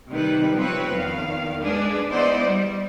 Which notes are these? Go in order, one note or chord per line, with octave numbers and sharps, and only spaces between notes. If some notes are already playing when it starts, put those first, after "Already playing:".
C3 D#3 G3 B4
F3 C4 B4 C#5
E2 D#3 F5
G#3 D4 G#4 B4
E3 B3 E4 C5 D5 D#5
G3